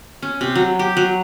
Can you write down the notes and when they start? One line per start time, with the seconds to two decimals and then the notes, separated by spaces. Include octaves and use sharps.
0.22 C#4
0.41 C3
0.55 F#3
0.79 G4
0.97 F#3